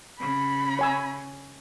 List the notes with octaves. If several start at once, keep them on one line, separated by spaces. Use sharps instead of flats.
C#3 B5
C#5 G#5 E6